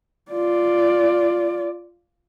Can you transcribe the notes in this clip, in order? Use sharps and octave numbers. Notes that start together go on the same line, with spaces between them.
F4 D5